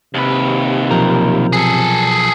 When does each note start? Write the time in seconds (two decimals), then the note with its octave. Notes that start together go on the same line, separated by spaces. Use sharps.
0.14 D#2 C3 B4
0.91 B1 F3 A#4
1.53 G#4 A4